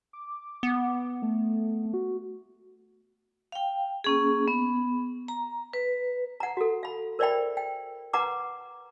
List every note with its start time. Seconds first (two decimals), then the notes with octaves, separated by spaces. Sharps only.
0.13 D6
0.63 B3
1.22 A3
1.94 F#4
3.52 F5 G5
4.04 A#3 C#4 G#4
4.48 B3
5.28 A#5
5.73 B4
6.40 F#5 A#5
6.57 F#4 A4
6.83 F5 B5
7.19 A#4 C5 D5 E5 G5 B5
7.57 G5
8.13 B4 F#5 A#5 D6